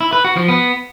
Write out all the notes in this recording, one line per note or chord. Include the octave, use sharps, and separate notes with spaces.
E4
B4
F#4
F3
B3